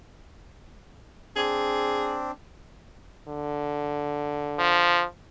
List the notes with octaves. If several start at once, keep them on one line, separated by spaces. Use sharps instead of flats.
C4 D4 G#4
D3
F3